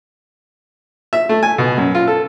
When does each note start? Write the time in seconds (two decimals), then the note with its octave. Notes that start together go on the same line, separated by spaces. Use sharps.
1.13 E5
1.29 A3
1.43 G#5
1.58 B2
1.77 F#2
1.95 F4
2.07 A4